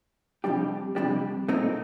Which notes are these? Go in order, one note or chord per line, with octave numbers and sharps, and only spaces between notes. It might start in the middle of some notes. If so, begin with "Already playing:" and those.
F2 C3 G3 D4 G4
F2 C3 G3 D4 G4
A#2 A3 C4 D#4 A#4